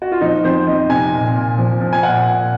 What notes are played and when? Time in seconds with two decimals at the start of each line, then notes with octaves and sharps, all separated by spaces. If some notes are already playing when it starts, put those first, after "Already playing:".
0.02 F#4
0.12 F4
0.21 F3 D#4
0.44 F2 C5
0.67 F2 D#5
0.89 C3 G#5
1.13 A#2
1.36 A#2
1.58 F3
1.81 F3
1.93 G#5
2.03 A#2 F#5
2.27 A#2